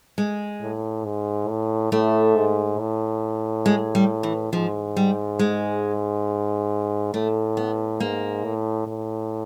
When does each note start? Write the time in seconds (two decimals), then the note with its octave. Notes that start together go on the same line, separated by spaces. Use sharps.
0.18 G#3
0.61 A2
1.05 G#2
1.48 A2
1.92 A2 A3
2.36 G#2
2.79 A2
3.66 G#3
3.95 G3
4.23 E3
4.53 G#2 F3
4.97 G3
5.39 G#3
7.13 A2 A3
7.57 B3
8.00 G#2 A#3
8.44 A2
8.87 A2